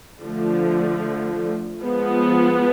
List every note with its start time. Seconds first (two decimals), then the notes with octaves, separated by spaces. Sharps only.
0.22 D3 F3 A3
1.81 F3 G#3 B3